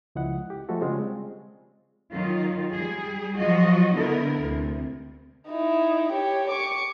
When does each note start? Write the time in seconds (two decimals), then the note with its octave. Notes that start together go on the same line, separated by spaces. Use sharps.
0.15 C#2 F3 E4 D#5 F#5
0.50 G4
0.69 F3 G#3 A3 F#4 A4
0.81 C#3 G3 G#3 C4 F4
2.12 D#3 F#3 F4
2.72 G3 G#4
3.38 F3 F#3 F4 F#4 D#5
3.94 D3 B3 E4 A#4
4.44 D2 C3
5.48 D#4 E4
6.13 G4 C#5
6.50 C#6 D6